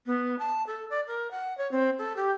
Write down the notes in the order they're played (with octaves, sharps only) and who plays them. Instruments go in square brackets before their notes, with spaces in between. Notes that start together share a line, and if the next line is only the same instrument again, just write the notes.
[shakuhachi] B3
A5
A4
D5
A#4
F#5
C#5
C4
A4
G4